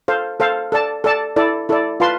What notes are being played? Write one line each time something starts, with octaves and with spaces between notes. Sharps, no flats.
A4 C5 F5
A4 C5 F5
A4 D5 A5
A4 D5 A5
E4 A4 D5
E4 A4 D5
F4 B4 F5 A5 C6